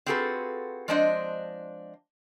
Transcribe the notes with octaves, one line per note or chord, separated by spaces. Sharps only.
C4 F4 F#4 G#4 A4 B4
F3 G#3 C4 D4 C5 D#5